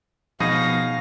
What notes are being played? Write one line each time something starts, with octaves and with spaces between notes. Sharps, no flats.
B2 F3 B3 D#4 G#4 F5 A#6